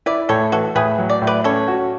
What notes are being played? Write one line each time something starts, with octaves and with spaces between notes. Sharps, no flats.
E4 B4 D5
A2 A4 C#5
E3 F#4 A4
A2 G#4 B4
F#3
D5
A2
B4 D5
C#4 A4 C#5
F#4